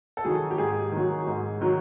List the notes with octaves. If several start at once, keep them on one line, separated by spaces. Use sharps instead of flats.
A4
D#3 F#3 G#4
G4
G#2 G#4
D#3 F#3
G#2
D#3 F#3